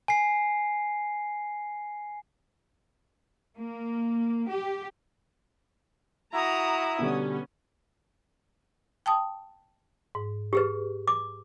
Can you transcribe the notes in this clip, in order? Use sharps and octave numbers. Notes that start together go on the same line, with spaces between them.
G#5 C7
A#3
G4
E4 F#4 A#5 D#6
B2 D3 G3 B3 C#4
G5 A5 D#6
G#2
G4 G#4 B4
D6